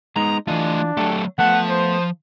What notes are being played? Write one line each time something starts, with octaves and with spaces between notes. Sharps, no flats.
G#3 B3 D#4 A#5
E3 A3 D4 F4 D#5
F#3 A3 G4 A4
F3 A3 B3 F#5 A5
C5